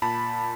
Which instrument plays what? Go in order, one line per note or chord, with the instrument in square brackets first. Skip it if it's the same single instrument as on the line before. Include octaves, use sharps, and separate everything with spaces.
[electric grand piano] A#2 A5 B5